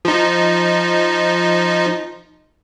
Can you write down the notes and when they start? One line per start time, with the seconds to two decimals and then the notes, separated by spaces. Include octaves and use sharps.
0.05 F3 D#4